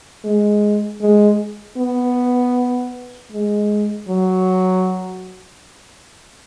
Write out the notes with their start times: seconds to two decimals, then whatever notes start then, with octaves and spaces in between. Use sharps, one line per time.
0.24 G#3
1.02 G#3
1.78 B3
3.32 G#3
4.09 F#3